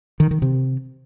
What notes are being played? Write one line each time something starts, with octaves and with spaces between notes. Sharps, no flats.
D#3
D#3
C3